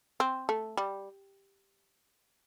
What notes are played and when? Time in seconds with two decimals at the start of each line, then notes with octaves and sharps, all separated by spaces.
0.20 C4
0.49 A3
0.77 G3